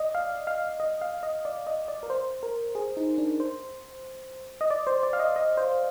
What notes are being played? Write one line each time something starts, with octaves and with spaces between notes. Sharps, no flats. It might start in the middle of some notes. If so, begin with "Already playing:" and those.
Already playing: D5 D#5
F5
F5
D#5
F5
D#5
D5
D#5
D5
A#4
C5
A#4
G#4
D#4
D4
C5
D#5
D5
C5
D5
F5
D#5
D#5
C5